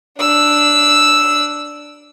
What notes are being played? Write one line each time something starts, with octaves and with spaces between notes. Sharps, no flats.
D4 E6